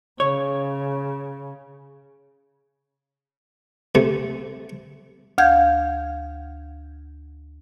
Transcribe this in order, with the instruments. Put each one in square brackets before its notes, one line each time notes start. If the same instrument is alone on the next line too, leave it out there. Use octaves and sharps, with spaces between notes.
[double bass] C#3 [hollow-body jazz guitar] C#5
[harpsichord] C3 A3
[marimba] D2 F5 G6 G#6